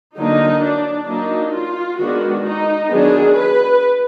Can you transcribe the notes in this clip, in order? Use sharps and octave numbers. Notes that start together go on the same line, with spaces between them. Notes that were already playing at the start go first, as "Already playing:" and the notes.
D3 F#3 A#3 D4 D#4
D4
F#3 A#3 D4 D#4
F4
D#3 G#3 B3 D4 F#4
D#4
D#3 F#3 B3 D4 G#4
B4